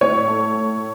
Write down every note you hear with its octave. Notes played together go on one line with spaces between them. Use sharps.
A2 C#5
A3
A3